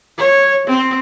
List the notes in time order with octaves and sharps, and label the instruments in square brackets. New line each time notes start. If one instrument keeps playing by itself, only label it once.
[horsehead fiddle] C#5
C4